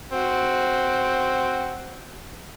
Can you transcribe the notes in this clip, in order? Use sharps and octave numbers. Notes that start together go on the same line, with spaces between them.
C4 F#4